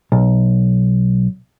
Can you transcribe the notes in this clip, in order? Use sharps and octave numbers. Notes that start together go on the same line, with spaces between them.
B1